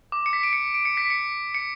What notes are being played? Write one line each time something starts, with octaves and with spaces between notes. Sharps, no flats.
D6
C#7
B6
D7
C#7
D7
C#7
B6
C#7
C#7